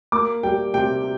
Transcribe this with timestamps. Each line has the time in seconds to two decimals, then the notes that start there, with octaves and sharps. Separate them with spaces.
0.12 A#3 D6
0.43 G3 G5
0.74 C3 G5